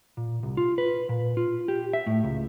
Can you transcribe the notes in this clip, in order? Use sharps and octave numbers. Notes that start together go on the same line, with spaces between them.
A#2
C2
F4
B4
A#2
F4
G4
E5
A2
C#2